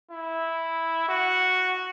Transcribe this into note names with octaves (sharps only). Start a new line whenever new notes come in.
E4
F#4